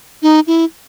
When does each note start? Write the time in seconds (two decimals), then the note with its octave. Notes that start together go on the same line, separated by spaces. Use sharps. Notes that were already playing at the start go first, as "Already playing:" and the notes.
0.22 D#4
0.47 E4